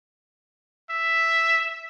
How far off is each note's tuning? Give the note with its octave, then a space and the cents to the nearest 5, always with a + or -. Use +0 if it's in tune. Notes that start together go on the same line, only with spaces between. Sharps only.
E5 +0